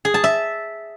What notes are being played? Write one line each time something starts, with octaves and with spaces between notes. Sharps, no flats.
G#4
A5
E5